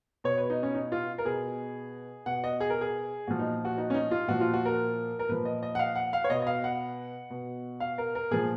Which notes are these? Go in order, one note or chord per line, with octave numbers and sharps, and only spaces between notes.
B2 C#5
B4
D#4
C#4
D#4
F4
A#4
B2 G#4
B2 F#5
D#5
G#4
A#4
G#4
A#2 F3 F#4
D#4
F#4
D#4
C#4
D#4
F4
A#2 F3 F#4
F4
F#4
A#4
A#4
A#2 F3 B4
D#5
D#5
F#5
F5
F#5
F5
C#5
B2 D#5
D#5
F5
F#5
B2
F5
A#4
A#4
A#2 F3 G#4